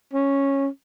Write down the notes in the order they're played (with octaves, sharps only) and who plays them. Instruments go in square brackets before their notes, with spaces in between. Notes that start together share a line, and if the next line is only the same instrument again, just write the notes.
[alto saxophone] C#4